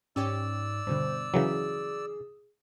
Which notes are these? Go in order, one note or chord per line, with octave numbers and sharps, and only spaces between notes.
G#2 C#4 G4 C#5 D5 E6
G2 B2 D3 C5
C#3 E3 F#3 G#4